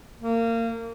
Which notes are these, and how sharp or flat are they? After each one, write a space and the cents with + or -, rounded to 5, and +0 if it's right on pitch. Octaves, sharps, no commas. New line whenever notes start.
A#3 -25